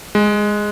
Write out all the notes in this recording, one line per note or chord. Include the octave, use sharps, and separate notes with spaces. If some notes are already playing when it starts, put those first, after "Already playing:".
G#3